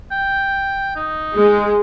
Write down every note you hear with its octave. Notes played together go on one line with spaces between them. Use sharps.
G5
D#4
G#3